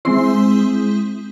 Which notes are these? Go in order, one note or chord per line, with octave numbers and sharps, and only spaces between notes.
G#3 C4 E4 C5 C6